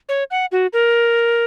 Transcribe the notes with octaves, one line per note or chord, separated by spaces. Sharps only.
C#5
F#5
F#4
A#4